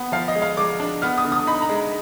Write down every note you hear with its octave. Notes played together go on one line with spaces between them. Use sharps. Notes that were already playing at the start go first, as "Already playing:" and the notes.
Already playing: B3
F3 F5
D#5
G#3
F5
G#3 D6
D4
B3 F6
D#6
D3
D#6
D#4 B5
A#5
G#3